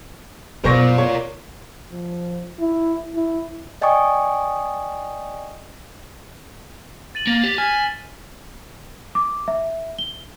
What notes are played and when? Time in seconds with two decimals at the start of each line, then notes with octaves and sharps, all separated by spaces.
0.64 F#2 B2 A#4 C5 D5 C#6 A#6
0.98 C#5
1.91 F3
2.60 E4
3.16 E4
3.81 D5 D#5 G5 G#5 C#6 D#6
7.15 A6 D#7 F#7
7.27 A#3
7.43 G4
7.58 G#5 F6 B6 E7
9.15 D6
9.48 E5
9.99 G7